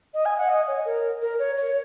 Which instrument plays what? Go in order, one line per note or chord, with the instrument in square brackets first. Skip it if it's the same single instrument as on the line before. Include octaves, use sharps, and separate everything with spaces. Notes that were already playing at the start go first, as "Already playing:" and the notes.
[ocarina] D#5
G#5
F#5
D#5
C#5
A#4
A#4
C#5
C#5